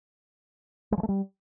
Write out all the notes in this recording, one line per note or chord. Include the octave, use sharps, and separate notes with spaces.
G#3
F3
A3
G3